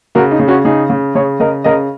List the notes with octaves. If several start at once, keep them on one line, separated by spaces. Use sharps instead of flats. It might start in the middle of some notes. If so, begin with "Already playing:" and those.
C#3 F#4 A#4
D#4
C#3
C#4 F#4
C#3 D#4 G#4
C#3
C#3 G#4 C#5
C#3 A#4 D#5
C#3 A#4 D#5